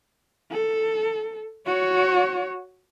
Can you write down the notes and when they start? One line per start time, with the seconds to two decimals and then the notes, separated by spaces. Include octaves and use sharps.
0.51 A4
1.66 F#4 C#5